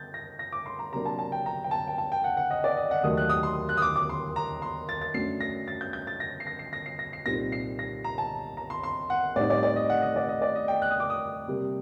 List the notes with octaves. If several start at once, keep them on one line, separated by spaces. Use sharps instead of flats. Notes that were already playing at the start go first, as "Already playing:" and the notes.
Already playing: G6 A6
A#6
A#6
D6
C6
A#5
C3 F#3 A#3 D4 A#5
A5
A5
G5
A#5
G5
A5
G5
A5
G5
F#5
F#5
D#5
D5
D#5
F#5
D#2 D#3 F#3 A3 D#6
F#6
D#6
C6
F#6
D#6
D6
D6
C6
A#5
C6
A6
A6
F#2 F#3 A3 D4 C7
A#6
A6
G6
G6
A6
A#6
C7
A#6
C7
A#6
C7
A#6
C7
C2 A#2 G3 C4 D#4 A#6
C7
A#6
A#5
A5
A#5
C6
C6
F#5
A2 G3 C4 D#4 D5
D5
D5
D#5
F#5
D#5
D5
D#5
D5
D#5
G5
F#6
D#6
D6
D#6
C3 G3 A#3